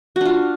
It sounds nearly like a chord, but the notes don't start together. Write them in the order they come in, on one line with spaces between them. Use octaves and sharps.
F#4 D4 F4